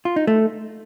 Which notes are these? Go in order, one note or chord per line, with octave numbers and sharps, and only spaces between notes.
F4
D#4
A3